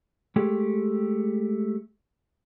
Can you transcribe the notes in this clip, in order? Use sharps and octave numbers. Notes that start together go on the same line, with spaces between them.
G#3 A3 G4